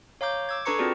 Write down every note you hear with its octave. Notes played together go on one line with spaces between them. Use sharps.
C#5 F5 A#5 D6 G6
D6 E6 G#6
D4 A4 B4 A#5 C#6 C#7
C4 F4 F#4 G#4 D5 A5